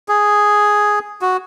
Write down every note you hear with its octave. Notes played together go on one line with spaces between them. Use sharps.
G#4
F#4